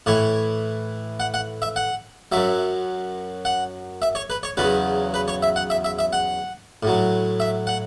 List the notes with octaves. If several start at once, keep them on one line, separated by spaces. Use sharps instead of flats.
A2 E3 C#5
F#5
F#5
E5
F#5
F#2 F#3 E5
F#5
E5
C#5
B4
C#5
E2 C#3 F#3 B4
B4
C#5
E5
F#5
E5
E5
E5
F#5
A2 F#3
E5
F#5